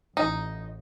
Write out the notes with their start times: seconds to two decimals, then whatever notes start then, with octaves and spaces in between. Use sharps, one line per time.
0.17 A1 D#4